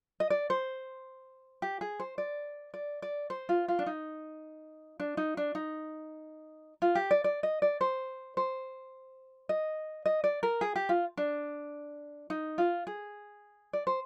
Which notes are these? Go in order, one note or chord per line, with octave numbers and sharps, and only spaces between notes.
D#5
D5
C5
G4
G#4
C5
D5
D5
D5
C5
F4
F4
D4
D#4
D4
D#4
D4
D#4
F4
G4
D5
D5
D#5
D5
C5
C5
D#5
D#5
D5
A#4
G#4
G4
F4
D4
D#4
F4
G#4
D5
C5